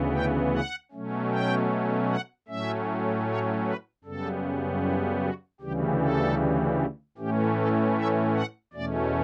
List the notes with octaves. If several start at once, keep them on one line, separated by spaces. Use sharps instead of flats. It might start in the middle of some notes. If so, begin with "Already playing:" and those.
Already playing: D2 C#3 E3 B3
G5
F#5
B2 F#3 A3 C#4
G5
F#5
A2 F#3 A3 C#4 E5
C#5
B4
F#2 C#3 G3 B3 A4
E4
F#4
D2 C#3 E3 G3 G4
A4
A2 E3 A3 C#4 G4
A4
E5
F#5
E2 B2 A3 C#4 D5